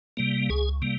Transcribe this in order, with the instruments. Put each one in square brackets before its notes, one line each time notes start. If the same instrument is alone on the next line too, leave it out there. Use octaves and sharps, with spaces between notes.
[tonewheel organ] C3 G3 A#3
C#2 G#4
C3 G3 A#3